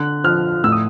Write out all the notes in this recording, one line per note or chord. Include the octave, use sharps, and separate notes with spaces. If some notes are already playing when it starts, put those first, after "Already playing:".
Already playing: D3 F#6
F3 F6
A2 E6
D#6